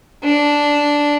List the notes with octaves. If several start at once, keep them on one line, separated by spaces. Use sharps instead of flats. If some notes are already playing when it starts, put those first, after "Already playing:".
D4